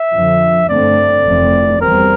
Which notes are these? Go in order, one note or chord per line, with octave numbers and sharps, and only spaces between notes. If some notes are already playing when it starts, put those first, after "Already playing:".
Already playing: E5
F2 D3 F3
G2 D3 A3 C4 D5
F1 F2 E3 A3 C4
E2 E3 G3 C4 A#4